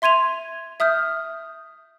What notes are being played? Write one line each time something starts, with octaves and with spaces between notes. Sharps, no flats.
E5 C6 G#6 D#7 F7
E5 D#6 F6 G6